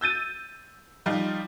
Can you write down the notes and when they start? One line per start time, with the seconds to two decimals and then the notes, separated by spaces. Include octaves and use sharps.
0.01 E6 G6 A6 D#7
1.06 F3 G3 D#4 F4